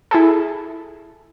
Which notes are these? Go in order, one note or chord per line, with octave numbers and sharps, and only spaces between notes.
E4 G#4 A4